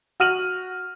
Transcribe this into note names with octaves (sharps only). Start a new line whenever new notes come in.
F#4 F6 D#7 F#7